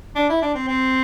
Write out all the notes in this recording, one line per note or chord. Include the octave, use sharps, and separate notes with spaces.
D4
E4
D4
C4
C4